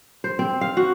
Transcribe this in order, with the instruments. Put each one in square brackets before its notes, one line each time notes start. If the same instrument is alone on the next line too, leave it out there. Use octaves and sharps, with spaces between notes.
[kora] C5
C4
F5
F#4